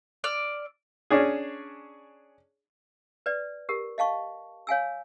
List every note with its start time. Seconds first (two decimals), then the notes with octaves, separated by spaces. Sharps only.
0.24 D5 E6 F6
1.10 C#4 D4 G#4
3.26 B4 D5
3.69 G4 A#4
3.98 D#5 F5 A5 C#6
4.67 C#5 F5 G#5 E6